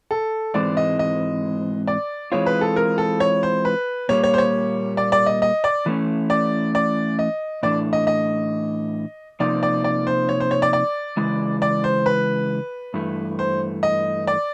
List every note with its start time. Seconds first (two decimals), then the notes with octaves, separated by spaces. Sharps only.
0.11 A4
0.54 G#2 E3 G#3 C4 D5
0.77 D#5
0.99 D#5
1.87 D5
2.32 E3 G#3 C4 F4 C#5
2.46 B4
2.61 A4
2.76 A#4
2.98 A4
3.20 C#5
3.43 C5
3.65 B4
4.09 A#2 G3 A#3 C#5
4.24 C#5
4.34 C5
4.38 C#5
4.97 D5
5.12 D5
5.26 D#5
5.42 D#5
5.64 D5
5.86 E3 A3 C#4
6.30 D5
6.75 D5
7.19 D#5
7.63 A2 E3 A3 D4 D5
7.93 D#5
8.07 D#5
9.40 C3 F3 A#3 D#4 D5
9.63 D5
9.84 D5
10.07 C5
10.29 C#5
10.40 C5
10.51 C#5
10.62 D5
10.73 D5
11.17 C#3 E3 G#3
11.62 D5
11.84 C5
12.06 B4
12.94 G2 E3 A3
13.39 C5
13.83 D#5
14.27 D5